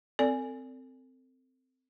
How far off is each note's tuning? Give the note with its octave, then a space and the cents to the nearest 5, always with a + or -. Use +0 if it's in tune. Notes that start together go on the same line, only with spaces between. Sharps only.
C4 -15 A4 +35 D5 -10